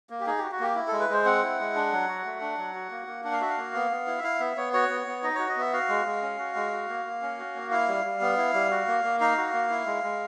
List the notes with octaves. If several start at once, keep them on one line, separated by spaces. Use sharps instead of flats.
A#3
G4
D#4 G#4
F#4 G4
F#4
A#3 G4
E4
G#3 A4
B4
G#3 C5
C4 F#5
E4
G#3
D4
F#3
F#4
A3
D4
F#3
F#4
A#3
A#3
D4 F#5
F5
F#4 E5
F5
A#3
B3
B3
E4
E5
E4 F5
B3 E5
B3 C#5
F#4 C#5
B3
B3
D#4 D#5
F#4 C#5
D#5
B3 E5
F#4 F5
G#3
G#3
C#4
F#4
G#3
F#4
A#3
A#3
C#4
F#4
A#3
E4 F5
G3
G3
B3
E4
G3
F#4
A#3
A#3
D#4 F5
F#4
A#3
E4
G#3
G#3